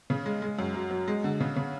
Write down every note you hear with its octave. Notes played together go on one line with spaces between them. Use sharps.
C#3
G#3
G#3
F#2
F#3
F#3
G#3
D3
C#3
C#3